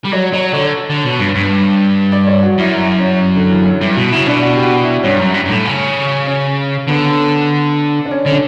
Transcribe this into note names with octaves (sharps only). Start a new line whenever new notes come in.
G3
F#3 C#5
F#3 C#5
D3 C#5
D3
B2
G2
G2
D5
C#5
F#4
F#2 E4
E4
C#4
D3
E3
F#3
G2 E4
B2 F#4
C#3 E4
B2 D4
F#4
G4
F#4
E4
G2 C#4
F#2
G2
G2
A2
C#3
C#4
D3 B3
D4
C#4
D3 C#4
D4